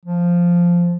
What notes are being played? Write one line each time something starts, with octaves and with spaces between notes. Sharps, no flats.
F3